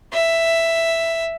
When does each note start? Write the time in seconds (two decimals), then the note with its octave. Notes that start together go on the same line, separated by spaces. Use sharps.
0.13 E5